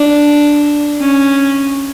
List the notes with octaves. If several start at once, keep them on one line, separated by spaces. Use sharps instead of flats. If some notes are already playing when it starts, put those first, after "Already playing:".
Already playing: D4
C#4